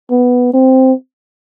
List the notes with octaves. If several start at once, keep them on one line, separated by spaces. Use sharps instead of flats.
B3
C4